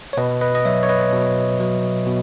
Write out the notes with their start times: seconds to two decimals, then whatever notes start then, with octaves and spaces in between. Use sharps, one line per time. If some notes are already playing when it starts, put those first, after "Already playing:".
0.13 C#5
0.17 B2 B4 D#5
0.41 B4 D#5
0.55 D#5
0.65 F#3 C#5 E5
0.83 C#5
0.89 B4 D#5
1.13 B2
1.60 F#3
2.07 B2